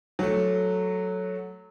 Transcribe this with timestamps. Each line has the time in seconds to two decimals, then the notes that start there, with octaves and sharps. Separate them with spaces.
0.19 F#3 A3